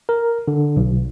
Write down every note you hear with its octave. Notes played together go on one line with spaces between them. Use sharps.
A#4
D3
B1